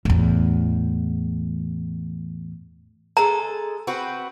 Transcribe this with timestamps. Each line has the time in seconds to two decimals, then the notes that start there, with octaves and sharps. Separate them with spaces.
0.05 E2 A2
3.17 G#3 A4 A#5
3.87 C4 F#4 B4